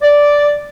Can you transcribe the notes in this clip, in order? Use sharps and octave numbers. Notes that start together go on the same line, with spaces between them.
D5